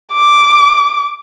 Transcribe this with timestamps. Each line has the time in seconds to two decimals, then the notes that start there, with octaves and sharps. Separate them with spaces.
0.13 D6